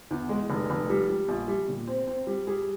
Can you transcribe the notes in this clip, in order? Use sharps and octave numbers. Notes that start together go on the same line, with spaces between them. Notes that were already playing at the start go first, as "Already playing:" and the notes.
E2
G#3
F1
F1
G3
G3
A#1
G3
A#2
C4
C4
G3
G3 G#4